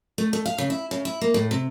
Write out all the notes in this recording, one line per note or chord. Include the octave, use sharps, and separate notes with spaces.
A3
A3
F5
C#3
E4
C#3
E4
A#3
A2
C3